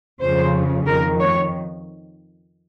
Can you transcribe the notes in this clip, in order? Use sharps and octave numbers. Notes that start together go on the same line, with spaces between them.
F2 C#3 F3 C5
F2 D#3 A#4
C#5